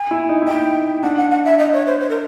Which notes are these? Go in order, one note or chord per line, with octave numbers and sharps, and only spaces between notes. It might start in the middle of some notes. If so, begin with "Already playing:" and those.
Already playing: G#5
E4
D#4
E4
D#4 G5
D4 F#5
F#5
F#5
E5
D#5
C#5
C5
C5
A#4